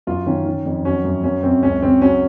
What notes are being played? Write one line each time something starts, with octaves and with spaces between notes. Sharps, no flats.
F#2 F4
D#3 C#4
D#3
F2
F#3 C#4
F#2
F#2 C#4
F#2 C4
C#2 C#4
C#3 C4
F#3 C#4